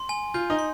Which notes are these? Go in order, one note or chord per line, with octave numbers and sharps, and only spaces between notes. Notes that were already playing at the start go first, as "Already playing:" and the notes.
Already playing: C6
G#5
F4 G6
D#4
C6